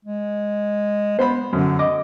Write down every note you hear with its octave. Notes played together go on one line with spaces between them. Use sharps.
G#3
B3 C5 B5
F#2 D3
D#5 D6